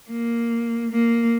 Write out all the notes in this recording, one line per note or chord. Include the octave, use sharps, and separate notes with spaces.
A#3
A#3